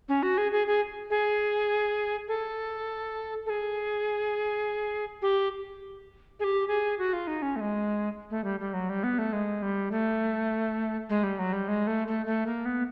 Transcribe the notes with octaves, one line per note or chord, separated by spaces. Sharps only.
C#4
F#4
G#4
G#4
G#4
G#4
A4
A4
G#4
G4
G#4
G4
G#4
F#4
F4
D#4
C#4
A3
G#3
A3
G3
G3
F#3
G3
B3
A3
G#3
G3
A3
G#3
G3
F#3
G3
G#3
A3
A3
A3
A#3
B3